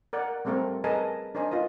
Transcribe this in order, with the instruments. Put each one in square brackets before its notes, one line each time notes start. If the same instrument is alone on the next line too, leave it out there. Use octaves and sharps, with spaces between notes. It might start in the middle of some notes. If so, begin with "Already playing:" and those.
[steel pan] A#4 D5 F#5
G3 A3 C4 A4 A#4 C5
G#4 A#4 B4 D#5 G#5 A5
D4 A#4 C5 D#5 G#5
F4 B4 D#5